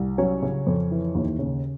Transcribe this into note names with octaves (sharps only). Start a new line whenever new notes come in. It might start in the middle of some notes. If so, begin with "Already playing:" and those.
Already playing: C2
F#3 C#4 C#5
C#3
F2
E3
D#2
C#3